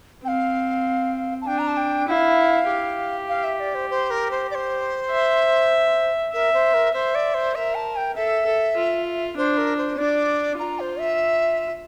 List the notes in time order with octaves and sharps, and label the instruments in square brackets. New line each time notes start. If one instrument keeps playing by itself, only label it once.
[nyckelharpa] C4 [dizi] G5
[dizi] F5
A5
[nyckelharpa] D4 [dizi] G5
[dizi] A#5
A5
G5
[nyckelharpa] E4 [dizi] F5 G5
[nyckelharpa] G4
[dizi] F5
E5
D5
C5
C5
A#4
C5
D5
C5
[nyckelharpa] E5
[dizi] A#4 [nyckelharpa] E5
[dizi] C5
A#4
[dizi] C5 [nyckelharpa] E5
[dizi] D5
C5
[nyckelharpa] A#4 [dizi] E5
[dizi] A5
G5
[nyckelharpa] A4 [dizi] E5
[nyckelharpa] A4
F4
[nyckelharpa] D4 [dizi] C5
[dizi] A#4
C5
[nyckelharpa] D4 [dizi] D5
[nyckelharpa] F4 [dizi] A#5
[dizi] C5
E5